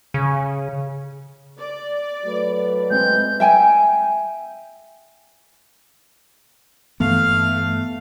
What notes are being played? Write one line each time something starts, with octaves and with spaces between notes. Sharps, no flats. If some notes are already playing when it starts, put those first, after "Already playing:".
C#3
D5
F#3 A3 B4
G#3 C4 G6
E5 G5 G#5
G2 E3 A3 B3 F5